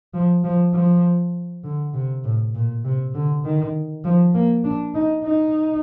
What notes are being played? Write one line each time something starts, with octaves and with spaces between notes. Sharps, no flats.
F3
F3
F3
D3
C3
A2
A#2
C3
D3
D#3
F3
A#3
D4
D#4
D#4